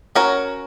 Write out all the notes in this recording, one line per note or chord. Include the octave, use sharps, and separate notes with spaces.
C#4 F#4 A#4 C#5